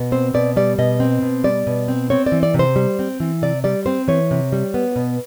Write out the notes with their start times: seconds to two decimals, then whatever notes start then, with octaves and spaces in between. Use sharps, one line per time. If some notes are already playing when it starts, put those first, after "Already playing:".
Already playing: B2
0.12 C4 C5
0.34 B2 D5
0.56 G3 D5
0.78 B2 D#5
1.00 C4
1.22 B2
1.44 G3 D5
1.67 B2
1.88 C4
2.10 C4 C#5
2.26 D5
2.32 E3
2.43 D5
2.54 C3
2.59 C5
2.76 G3
2.99 C4
3.20 E3
3.42 C3 D5
3.64 G3 D5
3.86 C4 C5
4.08 E3 C#5
4.31 C3
4.53 G3
4.74 B3
4.96 B2